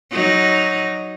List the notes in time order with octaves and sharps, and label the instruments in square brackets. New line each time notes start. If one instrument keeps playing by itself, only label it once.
[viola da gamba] F#3 D#4